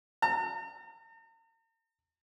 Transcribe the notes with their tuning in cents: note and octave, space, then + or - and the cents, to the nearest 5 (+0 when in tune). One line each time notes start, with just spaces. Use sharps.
A#5 -45